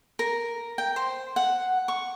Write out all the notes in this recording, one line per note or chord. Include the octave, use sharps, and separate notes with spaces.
A#4
G5
C5
F#5
C#6